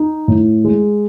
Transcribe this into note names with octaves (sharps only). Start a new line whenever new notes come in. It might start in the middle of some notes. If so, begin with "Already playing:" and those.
Already playing: D#4
A2
G#3